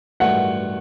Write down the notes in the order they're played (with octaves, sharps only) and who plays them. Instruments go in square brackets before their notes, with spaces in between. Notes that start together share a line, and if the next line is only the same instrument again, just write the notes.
[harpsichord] A1 G2 D#3 F#3 A3 [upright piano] F#5